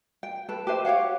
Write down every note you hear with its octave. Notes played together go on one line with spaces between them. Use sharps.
G5
A4 B4
G4 B4 C5 E5
G4 C#5 F5 F#5